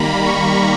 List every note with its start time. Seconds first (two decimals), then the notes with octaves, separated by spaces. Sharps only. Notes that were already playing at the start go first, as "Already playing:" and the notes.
Already playing: D#3 G3 A#3 A#5 B5
0.26 C#6